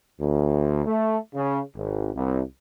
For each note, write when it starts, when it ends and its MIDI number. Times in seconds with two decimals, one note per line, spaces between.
0.21 0.83 38
0.86 1.16 57
1.34 1.59 49
1.75 2.10 32
2.14 2.41 36